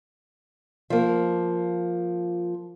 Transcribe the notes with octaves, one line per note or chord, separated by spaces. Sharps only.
F3 A#3